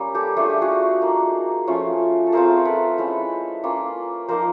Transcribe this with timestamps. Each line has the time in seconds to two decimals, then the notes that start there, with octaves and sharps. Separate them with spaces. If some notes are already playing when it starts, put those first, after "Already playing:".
Already playing: G3 A#3 C#4
0.15 G4 A4
0.37 A3 D4 F4 G#4
0.49 G4
0.62 F#4 G#4
1.02 A#3 D#4
1.67 F3 A3 C#4 F4
2.27 A4
2.32 A3 C4 F4 G#4 A#4
2.65 A4 B4
2.98 G#3 C#4 E4
3.63 A#3 C#4 F4
4.28 F3 A#3 D#4 A#4 C5